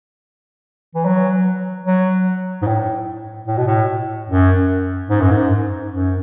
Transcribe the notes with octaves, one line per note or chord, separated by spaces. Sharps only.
E3
F#3
F#3
G#2
A2
A2
B2
A2
F#2
G#2
F#2
G#2
F#2